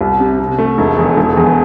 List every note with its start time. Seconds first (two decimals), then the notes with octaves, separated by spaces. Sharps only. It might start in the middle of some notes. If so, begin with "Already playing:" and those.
0.01 C2
0.20 C3
0.39 C3
0.58 A3
0.78 E1
0.98 E2
1.17 E1
1.37 E2